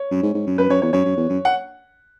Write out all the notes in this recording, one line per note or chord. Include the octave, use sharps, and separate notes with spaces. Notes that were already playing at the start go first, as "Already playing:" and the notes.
Already playing: C#5
F#2
G#2
G#2
F#2
F#2 B4
F#2 C#5
E2 C#5
F#2 C#5
F#2
E2
F#2
F#5